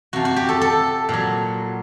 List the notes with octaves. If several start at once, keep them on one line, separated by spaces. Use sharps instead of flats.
C3 F3 F#4
F#4
G4
A4
A4
A#2 F#3